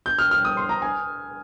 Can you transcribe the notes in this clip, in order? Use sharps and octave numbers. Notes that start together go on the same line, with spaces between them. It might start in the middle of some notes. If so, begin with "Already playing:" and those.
G6
F6
F6
D#6
C6
A#5
G#5